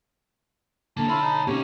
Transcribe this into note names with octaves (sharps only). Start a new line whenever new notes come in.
E2 D3 A#3 A5
E4 F4 C#5 B5
D#4
B2 A#3 C4 C#4 D#4 G4 C#5 G#5